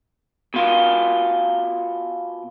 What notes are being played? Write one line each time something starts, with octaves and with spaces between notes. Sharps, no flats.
B2 F4